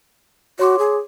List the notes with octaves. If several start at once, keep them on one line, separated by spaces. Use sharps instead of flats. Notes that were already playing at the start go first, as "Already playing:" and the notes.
F#4 C#5 C6 D6
G#4